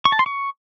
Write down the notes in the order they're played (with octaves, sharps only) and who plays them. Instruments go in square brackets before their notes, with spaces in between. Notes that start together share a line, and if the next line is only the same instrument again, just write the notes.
[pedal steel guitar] C#6
A5
C6
C#6